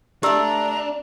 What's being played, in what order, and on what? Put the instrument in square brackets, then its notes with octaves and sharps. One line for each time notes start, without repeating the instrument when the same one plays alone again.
[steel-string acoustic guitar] D3 A3 [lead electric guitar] D4 [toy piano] G4 E6 [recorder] A#5